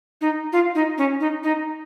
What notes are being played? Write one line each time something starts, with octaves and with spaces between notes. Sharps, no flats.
D#4
F4
D#4
C#4
D#4
D#4